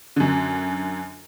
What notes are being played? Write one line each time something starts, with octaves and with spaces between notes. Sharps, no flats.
F#2 D3